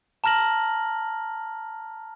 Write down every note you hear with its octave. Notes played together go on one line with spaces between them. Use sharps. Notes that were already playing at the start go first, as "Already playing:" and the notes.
A5 A#5 F6 A#6 F#7